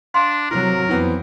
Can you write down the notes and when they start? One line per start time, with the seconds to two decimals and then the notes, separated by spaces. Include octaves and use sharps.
0.14 D4 F5 C6
0.51 C3 F#3 E4 A#4 C5
0.89 F2 E3 B3 C4